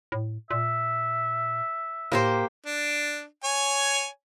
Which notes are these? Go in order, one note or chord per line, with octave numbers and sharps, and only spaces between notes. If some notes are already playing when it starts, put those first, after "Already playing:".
A2
A#2 E5
A2 A#3 G4 C5
D4
C#5 G#5